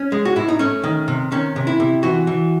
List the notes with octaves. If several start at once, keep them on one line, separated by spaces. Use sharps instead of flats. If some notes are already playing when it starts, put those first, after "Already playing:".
Already playing: C#4
G#3
F#4
A2 E4
D#4
A3 C#4
D#3
C3
D#3 C#4
C3
E4
C3
E3 F#4
E3